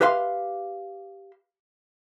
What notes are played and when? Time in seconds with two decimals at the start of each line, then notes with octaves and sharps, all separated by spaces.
0.01 G4 B4 E5 F5 C6